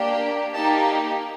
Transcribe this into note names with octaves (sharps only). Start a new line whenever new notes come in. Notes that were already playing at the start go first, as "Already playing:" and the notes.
Already playing: A#3 D4 G4
A#3 D#4 G4 A5